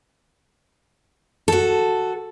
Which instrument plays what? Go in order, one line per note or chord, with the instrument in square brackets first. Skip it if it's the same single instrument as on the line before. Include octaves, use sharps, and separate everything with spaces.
[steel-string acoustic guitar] F#4 A4